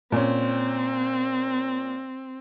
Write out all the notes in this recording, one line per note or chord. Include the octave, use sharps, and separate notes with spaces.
A#2 C4 C#4